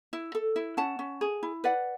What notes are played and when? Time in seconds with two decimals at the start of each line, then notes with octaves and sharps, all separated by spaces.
0.13 E4
0.35 A4
0.56 E4
0.77 C#4 F#5 A5
0.99 C#4
1.21 G#4
1.43 E4
1.64 B4 D5 F#5